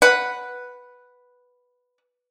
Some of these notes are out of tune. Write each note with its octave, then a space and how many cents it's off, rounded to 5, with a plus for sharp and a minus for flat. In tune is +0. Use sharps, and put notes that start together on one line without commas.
B4 +0 F#5 +0